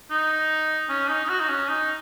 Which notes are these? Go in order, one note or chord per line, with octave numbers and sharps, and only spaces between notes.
D#4
C#4
D#4
D#4
F#4
D#4
C#4
D#4